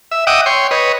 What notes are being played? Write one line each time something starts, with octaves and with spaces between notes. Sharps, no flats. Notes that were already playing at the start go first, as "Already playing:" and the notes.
E5
D#5 E5 F#5 G5 D6 D#6
C#5 G5 C6
B4 C#5 D#5